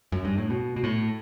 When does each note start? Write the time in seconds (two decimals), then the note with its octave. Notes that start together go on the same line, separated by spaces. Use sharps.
0.12 F#2
0.25 G2
0.38 A2
0.50 B2
0.76 B2
0.84 A2